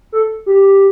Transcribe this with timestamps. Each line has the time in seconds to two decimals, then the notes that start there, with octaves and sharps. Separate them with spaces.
0.12 A4
0.46 G4